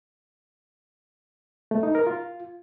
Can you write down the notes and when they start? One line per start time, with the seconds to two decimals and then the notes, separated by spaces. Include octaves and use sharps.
1.71 A3
1.83 D#4
1.95 A#4
2.07 F4